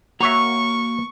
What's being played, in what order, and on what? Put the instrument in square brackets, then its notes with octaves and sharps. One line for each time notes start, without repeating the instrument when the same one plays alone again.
[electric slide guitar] A#3 A#5 [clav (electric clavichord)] F#4 C#5 E5 [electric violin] C#6